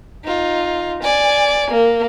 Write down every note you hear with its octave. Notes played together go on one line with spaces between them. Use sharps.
D#4 F4
D5 G#5
A#3